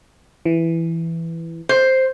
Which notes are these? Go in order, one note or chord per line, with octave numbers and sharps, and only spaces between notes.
E3
C5